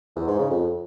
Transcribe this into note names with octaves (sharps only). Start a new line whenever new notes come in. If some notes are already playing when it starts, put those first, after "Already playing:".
E2
G#2
C#3
F2